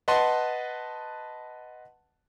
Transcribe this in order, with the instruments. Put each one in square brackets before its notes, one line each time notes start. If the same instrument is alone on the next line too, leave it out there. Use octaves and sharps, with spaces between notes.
[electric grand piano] B4 D#5 F#5 A5 C6